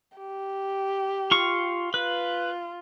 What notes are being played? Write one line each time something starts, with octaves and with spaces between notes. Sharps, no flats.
G4
F4 C#6
F4 B4